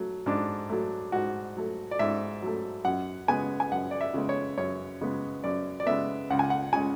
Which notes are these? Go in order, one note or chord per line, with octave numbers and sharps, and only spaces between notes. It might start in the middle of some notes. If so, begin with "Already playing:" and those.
Already playing: F#3 A3
G#2 D4
F#3 A3
G#2 F#4
F#3 A3
D5
G#2 E5
F#3 A3
F#2 F#5
C#3 G#3 B3 G#5
G#5
F#2 F#5
D5
E5
C#3 G#3 B3
C#5
F#2 C#5
C#3 G#3 B3
F#2 D5
D5
C#3 G#3 B3 E5
C#2 F#5
G#5
F#5
C#3 G#3 G#5